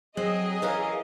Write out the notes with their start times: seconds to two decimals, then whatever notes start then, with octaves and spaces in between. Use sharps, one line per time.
0.17 F#3 C4 G#4 D#5
0.62 E3 C#4 A#4 F5